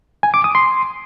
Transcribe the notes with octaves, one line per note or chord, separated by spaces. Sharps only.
G#5
D6
D#6
C6